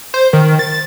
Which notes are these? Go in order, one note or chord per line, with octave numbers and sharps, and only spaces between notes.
C5
D#3
A6